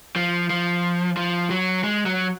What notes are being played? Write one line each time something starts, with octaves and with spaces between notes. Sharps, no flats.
F3
F3
F3
F#3
G#3
F#3